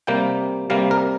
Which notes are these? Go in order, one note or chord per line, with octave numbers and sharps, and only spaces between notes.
C3 G3 A#3 G5
C3 G3 A#3 F5
A#4